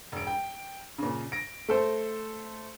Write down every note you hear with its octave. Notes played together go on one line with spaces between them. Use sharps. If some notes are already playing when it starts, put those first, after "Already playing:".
E1 D7
G5
A#2 C#3
A#6 D7
A3 A4 C5